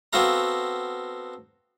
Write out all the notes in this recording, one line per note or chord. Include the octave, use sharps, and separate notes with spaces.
B3 C4 F#4 A4 F5 A#5